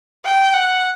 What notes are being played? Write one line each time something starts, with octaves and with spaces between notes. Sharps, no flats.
G5
F#5